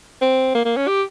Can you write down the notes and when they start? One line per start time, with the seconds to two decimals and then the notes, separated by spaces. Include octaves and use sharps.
0.22 C4
0.55 A#3
0.65 A#3
0.77 C#4
0.88 G4